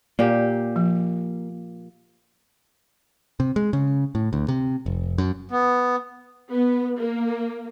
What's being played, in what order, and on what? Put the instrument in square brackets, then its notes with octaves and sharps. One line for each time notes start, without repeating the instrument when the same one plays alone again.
[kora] A#2 G4 [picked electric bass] A#3
[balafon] F3
[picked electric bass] C3
G#3
C#3
A2
D2
C3
F1
F#2
[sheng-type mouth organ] B3
[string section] B3
A#3